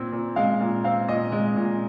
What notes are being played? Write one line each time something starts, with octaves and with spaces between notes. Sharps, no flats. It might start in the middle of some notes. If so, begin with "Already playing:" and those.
Already playing: A#2 C4
A#2
G#3 F5
A#2
C4 F5
A#2 D#5
G#3
A#2